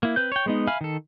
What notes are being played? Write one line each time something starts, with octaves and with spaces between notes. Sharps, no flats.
A#3 E4
C4 B4 G6
C#5 G5
G#3 B3 D#4
E5 F5 G#5 B5 F6
D#3 A4